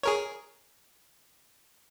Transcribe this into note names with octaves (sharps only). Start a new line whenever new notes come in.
G#4 A#4 C#5